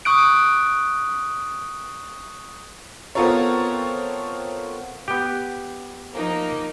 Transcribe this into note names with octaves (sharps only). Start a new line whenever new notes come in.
C#6 D#6 F#6 D7
B3 C4 F4 A4 A#4 C#5
B3 G4
F3 A#3 D#4